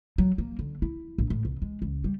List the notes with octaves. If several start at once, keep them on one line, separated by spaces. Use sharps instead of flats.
F#3
A#3
D3
E4
A#1
A2
C2
G#3
C#2
G3